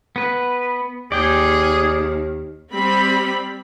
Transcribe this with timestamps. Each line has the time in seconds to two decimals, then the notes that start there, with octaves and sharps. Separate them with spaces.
0.16 B3 B4
1.12 D#2 G#4 D5 G5
2.73 G3 C4 B5